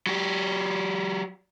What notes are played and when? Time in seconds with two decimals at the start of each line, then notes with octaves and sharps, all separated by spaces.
0.06 F#3 G4